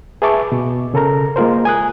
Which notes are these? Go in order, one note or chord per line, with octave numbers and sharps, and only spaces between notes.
G#4 B4 E5 A5 C#6 D6
B2
C#3 A4 A#4 A#5
G#3 A#3 F4 A#4 C5
G#5 D#6 F#6